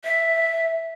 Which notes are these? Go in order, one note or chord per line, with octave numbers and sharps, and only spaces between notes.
E5